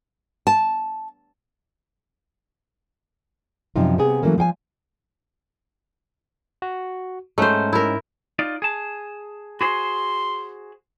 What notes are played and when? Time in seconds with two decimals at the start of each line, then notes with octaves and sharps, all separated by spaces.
0.47 A5
3.76 F#2 C3 F3 D#4 F4
3.98 C3 B3 G#4
4.22 E3 F#3 A3 A#3 C#4
4.38 F3 F5 G5 G#5
6.62 F#4
7.38 G#2 A3 C#4 D#4 C5
7.73 E4 A#4
8.39 D#4 F4 D5
8.62 G#4 A5
9.61 F#4 G#4 C5 C6